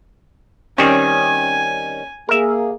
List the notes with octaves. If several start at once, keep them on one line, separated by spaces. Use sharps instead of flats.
D#3 G3 C4 C#4 G#5
A#3 G#4 A#4 E5